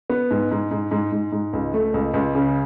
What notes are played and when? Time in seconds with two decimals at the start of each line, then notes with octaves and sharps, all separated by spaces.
0.10 B3
0.31 G#2
0.51 G#2
0.71 G#2
0.91 G#2
1.12 G#2
1.32 G#2
1.53 C#2
1.74 A3
1.94 C#2
2.14 C#2
2.35 C#3